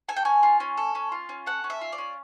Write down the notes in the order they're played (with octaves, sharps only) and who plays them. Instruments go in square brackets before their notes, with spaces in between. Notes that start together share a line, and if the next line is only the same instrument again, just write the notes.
[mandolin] A4 G#5
G5
C#4 G#5
F4
C#4
A4
C#4
F4
C#4
A4 F#5
C#4
E5
F4
D5
C#4